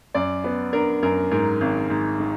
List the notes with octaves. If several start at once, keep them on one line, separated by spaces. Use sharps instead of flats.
F#2 D5
B3
D4 A#4
F#2 A#4
G#2 A#4
G#1
G#2
D#3